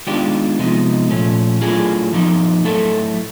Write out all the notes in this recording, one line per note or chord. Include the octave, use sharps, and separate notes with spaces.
D#3 G#3 B3 D4 F4 G4
C3 F3 G#3 B3 D#4
A#2 F3 A3 C#4
A2 F#3 A#3 D4 F4 G#4
F3 A#3 D#4
A2 F#3 A3 A4